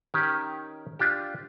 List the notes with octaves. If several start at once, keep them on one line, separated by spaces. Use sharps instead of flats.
D#3 C#4 G4
D4 F4 G4